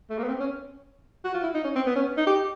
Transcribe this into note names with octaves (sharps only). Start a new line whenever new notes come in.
A3
A#3
B3
C4
C#4
F#4
F4
E4
D#4
C#4
C4
B3
C#4
D#4
G4